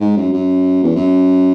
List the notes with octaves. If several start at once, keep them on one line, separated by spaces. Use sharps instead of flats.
G#2
F#2
F#2
E2
F#2